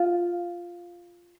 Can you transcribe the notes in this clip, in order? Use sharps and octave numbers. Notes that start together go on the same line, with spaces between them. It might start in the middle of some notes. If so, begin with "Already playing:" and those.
Already playing: F4